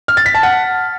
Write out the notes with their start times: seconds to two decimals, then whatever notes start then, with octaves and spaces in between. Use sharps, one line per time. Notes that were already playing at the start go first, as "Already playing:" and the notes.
0.08 F6
0.17 A6
0.26 B6
0.35 A5
0.43 F#5